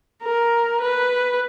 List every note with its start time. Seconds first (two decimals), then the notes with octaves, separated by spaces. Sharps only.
0.23 A#4
0.82 B4